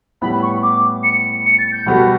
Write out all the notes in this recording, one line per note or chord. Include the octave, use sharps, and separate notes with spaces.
A2 G3 B3 E4 B5
C#6
D6
C#7
C#7
A6
G6
B2 G3 B3 F#4 A4